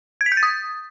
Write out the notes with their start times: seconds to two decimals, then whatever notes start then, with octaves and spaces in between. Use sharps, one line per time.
0.21 G#6
0.26 B6
0.32 G6
0.37 A6
0.43 D#6